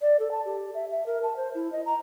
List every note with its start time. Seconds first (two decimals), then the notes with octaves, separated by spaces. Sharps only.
0.02 D5
0.20 A4
0.31 A5
0.45 G4
0.74 E5
0.91 E5
1.06 A#4
1.23 A5
1.36 C5
1.55 E4
1.72 D#5
1.86 A#5